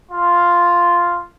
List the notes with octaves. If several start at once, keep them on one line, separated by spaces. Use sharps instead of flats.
F4